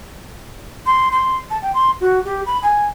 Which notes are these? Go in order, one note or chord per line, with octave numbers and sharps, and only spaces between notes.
C6
C6
A5
G5
C6
F#4
G4
B5
G#5